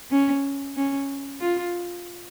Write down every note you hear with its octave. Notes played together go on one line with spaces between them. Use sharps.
C#4
C#4
F4